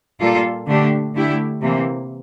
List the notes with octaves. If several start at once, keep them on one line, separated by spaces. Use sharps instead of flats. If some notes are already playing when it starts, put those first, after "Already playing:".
A#2 G3 A#3 F4 A4
D3 A3 D4 G4
D3 A3 E4 G4
C3 E3 A#3